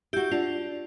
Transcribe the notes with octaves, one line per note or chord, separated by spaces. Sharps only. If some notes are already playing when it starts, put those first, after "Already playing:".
E4 F#4 G4 G6
D4 F4